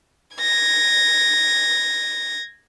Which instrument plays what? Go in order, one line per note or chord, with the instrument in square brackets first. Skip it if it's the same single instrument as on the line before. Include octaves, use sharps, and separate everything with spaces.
[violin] G#6 A#6